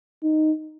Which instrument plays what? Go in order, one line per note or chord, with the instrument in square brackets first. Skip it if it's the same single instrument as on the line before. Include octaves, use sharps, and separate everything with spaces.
[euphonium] D#4